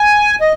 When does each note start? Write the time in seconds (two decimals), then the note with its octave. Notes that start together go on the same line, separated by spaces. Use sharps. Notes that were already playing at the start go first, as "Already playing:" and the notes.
Already playing: G#5
0.41 D#5